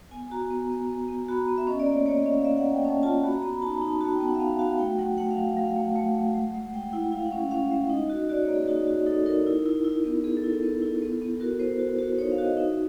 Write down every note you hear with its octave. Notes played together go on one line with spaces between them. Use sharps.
B3 G#5
F#4 A#5
B3
B3
B3
B3
F#4 B5
A#5
B3 A#5
E5
C#4 D#5
D5
A#3
C#5
A#3 C#5
D#5
C#4
F5
A#3 E5
F#5
A#3
G5
C#4 A5
F4 A5
F#4 B5
A#5
B3 A#5
B5
D#4 A5
A#5
D#4
A#5
F#4 A5
G5
B3
F#5
E5
B3 F5
F#4 F5
A3 G5
F#3 F#5
A3 F#5
F5
F#3
F5
F#3 F5
F5
A3
F#5
A3
A3
G#3
G#3
G#3 G5
E4 F#5
E4 F5
F#5
C#4
C#4 F5
G#3 E5
D#4 D#5
F#4 D#5
F#4 D5
C#5
A#3
G#4
D#4 F#4
F#4
D#4 A4
D#4 A#4
E4
E4
E4
B3
B3 G#4
A4
E4
A4
B3
E4
B3
B3
F#4 A#4
B3 C5
F#4
F#4
D#4 C#5
F5
F#4
D#5
D#4 E5